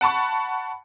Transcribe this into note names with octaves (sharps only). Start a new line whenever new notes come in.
F#5 A5 B5 C#6